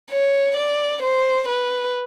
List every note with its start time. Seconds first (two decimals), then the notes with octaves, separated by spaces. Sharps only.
0.10 C#5
0.57 D5
1.02 C5
1.48 B4